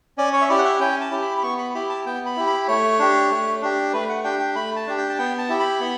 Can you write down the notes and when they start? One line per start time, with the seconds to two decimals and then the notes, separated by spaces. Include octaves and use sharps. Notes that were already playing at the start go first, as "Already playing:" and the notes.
0.18 C#4 D5
0.33 C#5
0.41 E5
0.49 E4 G4 D5
0.59 F#5
0.65 E5
0.80 C#4 G5
1.01 A5
1.11 E4 G4
1.22 B5
1.38 B5
1.43 B3 C#6
1.58 B5
1.75 E4 G4 B5
1.89 A5
2.06 B3 G5
2.26 B5
2.36 E4 G4
2.47 B5
2.68 A3 C#5
2.99 D4 G4
3.30 A3
3.62 D4 G4
3.93 A3 B4
4.09 F#5
4.24 D4 G4 G5
4.39 G5
4.55 A3 B5
4.76 A5
4.87 D4 G4
4.98 G5
5.09 A5
5.18 B3 G5
5.39 A5
5.49 E4 G4
5.59 B5
5.80 B3